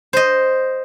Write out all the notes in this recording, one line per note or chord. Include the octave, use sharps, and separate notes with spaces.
C5 D#5